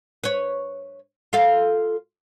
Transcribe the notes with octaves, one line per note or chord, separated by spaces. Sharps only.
B4 C#5
F4 A4 F5